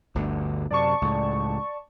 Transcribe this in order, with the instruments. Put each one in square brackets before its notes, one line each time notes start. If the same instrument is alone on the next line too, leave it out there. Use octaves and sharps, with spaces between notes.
[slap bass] G1 D2 D3
[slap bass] F#2 C3 [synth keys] D5 A5 C#6
[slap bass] C#2 A2